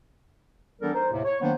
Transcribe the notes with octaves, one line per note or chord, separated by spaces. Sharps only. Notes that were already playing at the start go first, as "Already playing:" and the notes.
E3 G3 B3 D4 A4 A#4
D#4 A#4 C5
D#2 A2 C3
C#5
D#3 F#3 A#3 B3 D4 C5